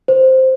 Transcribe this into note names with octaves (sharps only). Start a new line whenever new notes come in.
C5